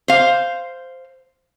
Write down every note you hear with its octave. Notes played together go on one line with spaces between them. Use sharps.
C5 F5